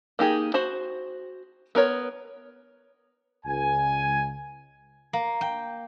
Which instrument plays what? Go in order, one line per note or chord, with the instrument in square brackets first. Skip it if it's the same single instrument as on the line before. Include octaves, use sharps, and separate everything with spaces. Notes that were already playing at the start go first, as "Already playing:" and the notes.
[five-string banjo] A#3 D#4 G4 G#4
F#4 C5 B5
B3 A#4 C#5
[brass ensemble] C#2 G#5
[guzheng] A#3
G5